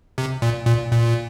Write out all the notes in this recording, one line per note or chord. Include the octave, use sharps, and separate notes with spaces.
C3
A#2
A#2
A#2